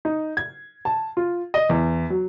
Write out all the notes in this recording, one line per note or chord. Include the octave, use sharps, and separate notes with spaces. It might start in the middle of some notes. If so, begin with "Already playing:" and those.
D#4
G#6
A5
F4
D#5
E2
F#3